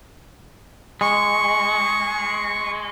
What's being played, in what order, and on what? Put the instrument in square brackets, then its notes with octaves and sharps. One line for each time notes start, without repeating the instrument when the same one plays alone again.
[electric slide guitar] G#3 [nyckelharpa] C#6